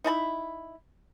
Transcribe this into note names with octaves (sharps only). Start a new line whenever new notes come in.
D#4 E4 A5 B5